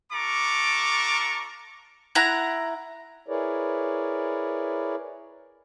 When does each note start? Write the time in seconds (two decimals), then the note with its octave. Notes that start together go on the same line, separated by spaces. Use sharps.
0.12 D4 F4 A4 A#5 C#6 D6
2.15 E4 F#5 A#5
3.28 E4 G#4 A#4 B4 C#5 D5